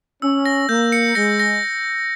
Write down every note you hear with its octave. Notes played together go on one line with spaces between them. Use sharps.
C#4 E6
A#6
A#3 G6
C#7
G#3 A#6
A#6